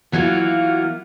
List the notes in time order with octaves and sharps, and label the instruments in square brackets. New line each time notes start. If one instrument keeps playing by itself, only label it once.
[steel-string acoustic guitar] E3 F#3 A#3 F4 F#4